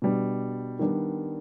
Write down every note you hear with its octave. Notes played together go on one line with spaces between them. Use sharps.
B2 G3 D4
D#3 G3 B3 D4